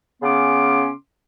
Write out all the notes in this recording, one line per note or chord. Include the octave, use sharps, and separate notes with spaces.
C#3 B3 C#4 C6 D6